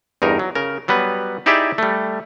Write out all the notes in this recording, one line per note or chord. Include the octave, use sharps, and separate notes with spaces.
E2 G2 D#4 A#4
F#3
C#3 A#4
F#3 G3 B3 B4
D#4 E4 G4 G#4 D5 E5
G3 A3